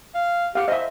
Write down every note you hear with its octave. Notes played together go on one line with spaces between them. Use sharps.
F5
G4 F5 F#5
C5 D#5 E5